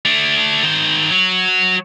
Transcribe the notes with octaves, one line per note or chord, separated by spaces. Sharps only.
A3 D4
D#3 C5
F#3 F#4